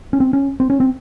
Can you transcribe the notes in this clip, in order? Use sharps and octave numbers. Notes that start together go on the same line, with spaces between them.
C#4
C4
C#4
C4
C#4
C4